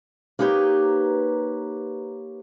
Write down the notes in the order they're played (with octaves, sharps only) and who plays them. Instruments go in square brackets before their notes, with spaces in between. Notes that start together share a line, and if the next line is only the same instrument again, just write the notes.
[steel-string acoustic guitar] A#3 D#4 G4 B4 C#5